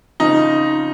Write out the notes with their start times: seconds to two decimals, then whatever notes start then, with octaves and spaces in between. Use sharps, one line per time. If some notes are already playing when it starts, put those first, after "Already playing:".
0.20 C#3 F3 C4 D#4 F4